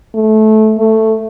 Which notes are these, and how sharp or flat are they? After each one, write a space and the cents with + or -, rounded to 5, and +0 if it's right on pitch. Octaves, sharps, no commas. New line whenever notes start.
A3 -20
A3 +5